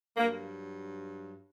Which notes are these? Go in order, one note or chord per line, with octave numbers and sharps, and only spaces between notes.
G2 F#3 A#3